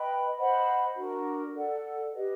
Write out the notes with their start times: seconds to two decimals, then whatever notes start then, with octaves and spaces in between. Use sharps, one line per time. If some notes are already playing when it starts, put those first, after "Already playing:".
Already playing: B4 D#5 G5 B5
0.38 C5 D#5 F#5 B5
0.96 D4 F#4 A#4
1.54 A4 D5 F#5
2.12 G4 B4 D#5